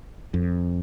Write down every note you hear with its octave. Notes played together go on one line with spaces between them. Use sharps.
F2